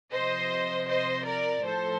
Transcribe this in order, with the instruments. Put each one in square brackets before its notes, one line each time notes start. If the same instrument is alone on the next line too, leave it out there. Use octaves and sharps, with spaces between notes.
[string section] C3 F3 C5 D#5
C5 D#5
A#4 D5
A2 F3 A4 C5